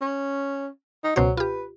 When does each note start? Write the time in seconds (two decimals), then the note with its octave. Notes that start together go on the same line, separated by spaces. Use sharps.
0.01 C#4
1.04 D#4
1.16 C#2 B2 F#3 C5
1.37 F4 G4 B4